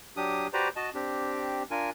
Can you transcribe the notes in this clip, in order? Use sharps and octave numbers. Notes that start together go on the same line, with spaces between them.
F#3 D4 G4 D#6
F#4 G4 B4 C5 D5 A#5
F#4 D#5 A5
C4 D4 G4
D4 F4 A#4 G#5